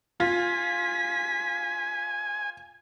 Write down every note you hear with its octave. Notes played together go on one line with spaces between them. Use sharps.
F4 G#5 B6